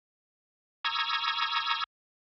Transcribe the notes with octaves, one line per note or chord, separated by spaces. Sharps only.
A#5 C#6 D#6 E6 G#6